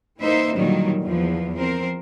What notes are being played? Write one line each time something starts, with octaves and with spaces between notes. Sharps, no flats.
E3 A#3 D#4 C5 E5
A#2 D3 D#3 F#3 G3
E2 F3
F3 C4 A#4 C5